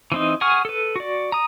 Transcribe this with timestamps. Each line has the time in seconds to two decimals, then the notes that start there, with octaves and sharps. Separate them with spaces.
0.12 E3 C4 D#4
0.41 G#4 F#5 G#5 C#6 F6
0.65 A4 B4
0.96 F#4 D5
1.32 A#5 D#6